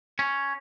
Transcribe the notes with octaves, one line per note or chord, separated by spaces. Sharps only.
C#4